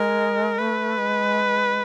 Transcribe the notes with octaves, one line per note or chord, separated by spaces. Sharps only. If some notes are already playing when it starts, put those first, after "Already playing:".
Already playing: G#3 A#4
A3 B4
G#3